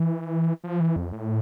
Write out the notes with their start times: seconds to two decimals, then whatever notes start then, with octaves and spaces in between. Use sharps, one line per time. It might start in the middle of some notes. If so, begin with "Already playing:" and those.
Already playing: E3
0.64 F3
0.80 E3
0.96 F2
1.12 A2